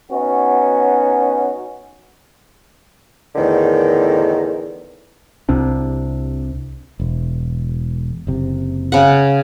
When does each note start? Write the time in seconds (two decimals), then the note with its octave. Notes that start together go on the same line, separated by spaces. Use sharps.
0.11 B3 C#4 D#4 F#4
3.36 E2 A2 D3 D#3
5.49 C2 C3 D4
7.00 E1
8.27 F#1 C3
8.92 C#3 F#5